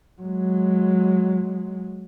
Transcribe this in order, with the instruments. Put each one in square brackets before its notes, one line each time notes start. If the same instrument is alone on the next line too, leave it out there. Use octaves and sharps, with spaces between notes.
[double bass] F#3 G#3